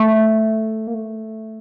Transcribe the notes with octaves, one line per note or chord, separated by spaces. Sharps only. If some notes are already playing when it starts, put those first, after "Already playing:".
Already playing: A3
A#3
A3